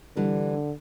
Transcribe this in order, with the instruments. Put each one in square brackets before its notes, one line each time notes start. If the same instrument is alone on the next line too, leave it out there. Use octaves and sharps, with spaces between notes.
[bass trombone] D3 [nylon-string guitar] E3 G3 D4